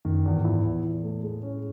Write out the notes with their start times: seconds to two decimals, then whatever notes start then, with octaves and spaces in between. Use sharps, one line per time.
0.05 F#2 D#3
0.25 E2
0.35 G#2
0.45 E4
0.64 E2 A2
0.84 E2
1.03 A3
1.23 G#3
1.43 C#4